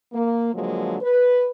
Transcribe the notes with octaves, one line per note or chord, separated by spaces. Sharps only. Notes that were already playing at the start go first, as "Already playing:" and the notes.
A#3
D3 F3 F#3 G#3 A#3
B4